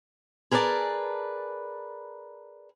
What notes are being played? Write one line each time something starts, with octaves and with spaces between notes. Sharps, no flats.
G#4 A#4 B4 C#5 D5 A5